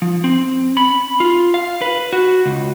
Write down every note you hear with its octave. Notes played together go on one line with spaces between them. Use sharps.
F3
C4
B5
F4
F5
B4
F#4
C#2